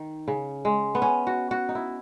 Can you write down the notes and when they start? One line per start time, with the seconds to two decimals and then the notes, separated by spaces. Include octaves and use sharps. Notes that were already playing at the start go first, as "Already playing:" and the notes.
Already playing: D#3
0.28 C#3
0.65 G#3
0.95 B3
1.02 C#4
1.27 F#4
1.51 F#4
1.69 D#4
1.75 E4